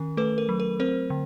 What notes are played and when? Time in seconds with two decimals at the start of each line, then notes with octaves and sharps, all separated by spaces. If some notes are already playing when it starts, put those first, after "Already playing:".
Already playing: D#3 C#4 A#4
0.17 A3 A4 B4
0.38 A#4
0.49 F#3
0.60 A#4
0.80 C4 A#4 C5
1.10 D3